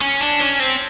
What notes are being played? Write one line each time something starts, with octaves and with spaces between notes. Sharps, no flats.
C#4
D4
C#4
C4